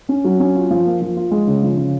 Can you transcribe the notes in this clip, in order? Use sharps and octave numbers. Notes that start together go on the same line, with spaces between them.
C#4
F#3
C#4
F4
F3
A#3
F3
F4
G#3
C#3
F3
C#3